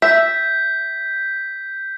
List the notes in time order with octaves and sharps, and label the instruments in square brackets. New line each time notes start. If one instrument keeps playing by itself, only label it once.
[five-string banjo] E5 [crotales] G6 B6